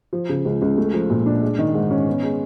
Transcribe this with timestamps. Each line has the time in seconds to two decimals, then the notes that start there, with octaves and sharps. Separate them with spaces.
0.13 F3
0.29 C#3
0.45 C#2
0.62 C#2
0.78 A3
0.94 F3
1.10 A#2
1.26 D4
1.42 G#3
1.59 D#3
1.74 G#2
1.91 C#4
2.07 B3
2.23 G#3